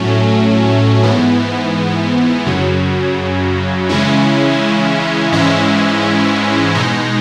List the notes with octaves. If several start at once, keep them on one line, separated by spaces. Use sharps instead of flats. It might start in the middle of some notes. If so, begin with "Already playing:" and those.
Already playing: A2 F#3 A3 C#4
G#2 E3 B3
F#2 C#3 F#3
C#3 E3 G#3 C#4 E4
G#2 E3 G#3 C#4 E4
B2 G#3 D#4